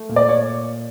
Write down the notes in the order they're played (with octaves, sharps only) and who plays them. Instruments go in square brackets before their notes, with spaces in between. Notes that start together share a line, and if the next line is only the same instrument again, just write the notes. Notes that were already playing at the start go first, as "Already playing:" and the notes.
Already playing: [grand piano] A3
A#2
D5
C#5